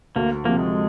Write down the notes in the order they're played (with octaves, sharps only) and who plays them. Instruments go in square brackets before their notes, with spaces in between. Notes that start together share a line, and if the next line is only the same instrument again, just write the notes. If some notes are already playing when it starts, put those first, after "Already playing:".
[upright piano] D2 [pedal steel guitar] A#3
[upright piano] C3 F3 [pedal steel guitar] A#3
[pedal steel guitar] G#3